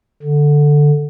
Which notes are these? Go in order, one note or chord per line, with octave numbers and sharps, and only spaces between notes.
D3